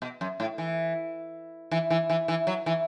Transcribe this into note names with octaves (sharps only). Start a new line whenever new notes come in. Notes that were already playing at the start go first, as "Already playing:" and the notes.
B2
F#2
A2
E3
E3
E3
E3
E3
F#3
E3